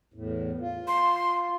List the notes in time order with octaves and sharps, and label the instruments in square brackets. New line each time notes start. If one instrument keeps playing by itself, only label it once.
[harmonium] E2 A2
F4
[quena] C6